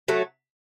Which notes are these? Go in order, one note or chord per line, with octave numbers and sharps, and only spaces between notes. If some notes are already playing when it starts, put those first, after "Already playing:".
F#3 A3